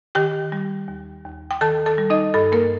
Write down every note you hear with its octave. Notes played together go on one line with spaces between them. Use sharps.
D#3 G4 G5
G3
D#2
D#2
G5
D#3 A4 A5
A4 A5
G3
D#4 D#5
G2 A4
A#3 A#4